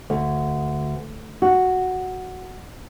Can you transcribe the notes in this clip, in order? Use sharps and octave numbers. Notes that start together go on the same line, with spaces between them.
D2
F#4